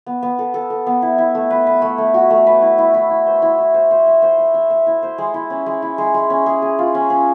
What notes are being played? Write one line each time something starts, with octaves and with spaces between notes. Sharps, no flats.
B3
B3
A4
A4
A4
B3
E4
E4
A3
B4
B4
A3
A3
F#4
A3
B4
E4
E4
E4
E4
C5
E4
E4
C5
C5
E5
C5
E5
E5
E5
E4
C5
G#3
E4
C#4
G#3
E4
G#3
G#3
C#4
G#4
G#4
F4
C#4
C#4